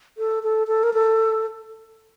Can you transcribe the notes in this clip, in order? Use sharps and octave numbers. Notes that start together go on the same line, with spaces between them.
A4
A4
A4
A#4
A4